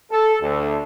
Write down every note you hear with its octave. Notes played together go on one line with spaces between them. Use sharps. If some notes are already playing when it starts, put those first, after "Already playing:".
A4
D2